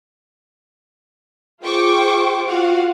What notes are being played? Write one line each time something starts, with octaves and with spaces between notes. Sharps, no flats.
F4 G#4 C5 G5 C#6 D6
F4 F#4 F5 F#5